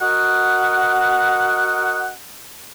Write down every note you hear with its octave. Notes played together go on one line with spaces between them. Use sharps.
F#4 A#4 D#5 F#5